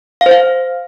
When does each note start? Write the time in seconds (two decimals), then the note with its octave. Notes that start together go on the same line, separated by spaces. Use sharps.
0.21 F5
0.26 C5
0.31 F5